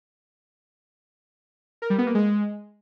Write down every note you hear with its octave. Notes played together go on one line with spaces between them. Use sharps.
A#4
G3
B3
A#3
G#3